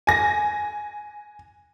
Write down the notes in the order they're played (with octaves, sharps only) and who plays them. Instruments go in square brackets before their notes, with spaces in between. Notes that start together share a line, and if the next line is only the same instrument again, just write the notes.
[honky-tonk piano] G#5 A#6